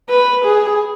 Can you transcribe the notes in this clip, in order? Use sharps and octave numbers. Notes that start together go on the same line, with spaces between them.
B4
G#4